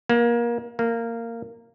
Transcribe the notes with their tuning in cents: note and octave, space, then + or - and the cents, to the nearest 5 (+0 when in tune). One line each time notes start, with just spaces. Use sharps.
A#3 +25
A#3 -15